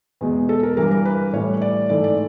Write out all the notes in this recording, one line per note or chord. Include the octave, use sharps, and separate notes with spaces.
E2 B2 G#3
A4
A#4
G2 E3 G3 A#4
A#4
B4
A2 E3 G3 C#5
D5
G#2 E3 A3 D5
D5